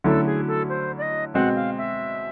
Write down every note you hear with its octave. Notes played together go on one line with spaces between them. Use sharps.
D3 F#3 A3 C#4 E4 A4
G#4
A4
C5
D5
D#5
B2 G#3 C4 F#5
F5
E5